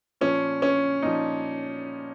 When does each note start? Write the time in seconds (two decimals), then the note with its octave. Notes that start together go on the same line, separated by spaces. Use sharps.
0.21 A#2 F3 C#4
0.62 C#4
1.02 A#2 F3 D#4